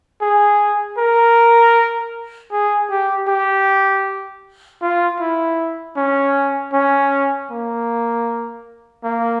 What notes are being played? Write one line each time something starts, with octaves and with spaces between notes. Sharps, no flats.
G#4
A#4
G#4
G4
G4
F4
E4
C#4
C#4
A#3
A#3